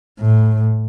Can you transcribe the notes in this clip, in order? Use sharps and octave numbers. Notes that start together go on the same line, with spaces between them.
A2